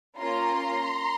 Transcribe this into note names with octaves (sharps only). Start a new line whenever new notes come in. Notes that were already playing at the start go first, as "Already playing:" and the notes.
A#3 C#4 F4 A#5 C6